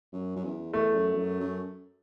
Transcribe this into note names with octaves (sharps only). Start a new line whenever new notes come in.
F#2
F#2
E2
E2 A3
F#2
E2
F#2
F#2